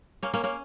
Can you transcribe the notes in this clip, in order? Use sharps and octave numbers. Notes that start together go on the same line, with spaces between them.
A#3 C#4
A#3 C#4
A#3 C#4